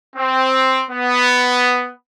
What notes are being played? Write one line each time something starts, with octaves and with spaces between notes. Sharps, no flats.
C4
B3